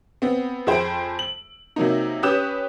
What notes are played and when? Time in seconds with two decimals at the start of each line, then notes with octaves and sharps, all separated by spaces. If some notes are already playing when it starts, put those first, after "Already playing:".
0.22 B3 C4
0.67 F2 G#4 C5 G5 B5 D7
1.19 F#7
1.76 C3 F#3 A#3 D#4
2.23 C#4 G4 B4 D#6 G6 E7